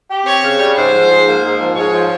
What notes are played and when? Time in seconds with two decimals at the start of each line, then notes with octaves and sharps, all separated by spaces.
0.09 G4
0.26 C4 C#5
0.42 C#3
0.59 G3
0.76 G#2 C5
0.93 F3
1.09 G#2
1.26 A#3
1.43 G#2
1.60 F3
1.76 G#2 C#5
1.93 F3